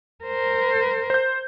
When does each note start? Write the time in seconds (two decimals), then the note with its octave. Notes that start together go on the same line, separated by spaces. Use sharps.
0.24 A#4 C5
1.10 C5 G6